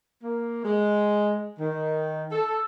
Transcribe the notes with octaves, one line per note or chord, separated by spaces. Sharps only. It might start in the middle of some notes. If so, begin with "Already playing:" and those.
A#3
G#3
D#3
A4